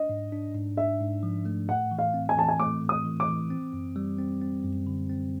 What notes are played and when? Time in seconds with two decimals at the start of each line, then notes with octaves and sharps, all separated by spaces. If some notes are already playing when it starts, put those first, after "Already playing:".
Already playing: D4 D#5
0.09 G#2
0.32 D4
0.55 G#2
0.77 D4 E5
1.01 G#2
1.23 F3
1.45 A3
1.68 A2 F#5
1.91 E3
1.99 F5
2.14 C4
2.29 G#5
2.37 E3 A5
2.48 G#5
2.59 A3 D6
2.82 A2
2.89 D#6
3.05 E3
3.20 D6
3.28 E3
3.50 C4
3.73 F#2
3.96 G3
4.18 C4
4.41 C4
4.64 F#2
4.87 D3
5.09 C4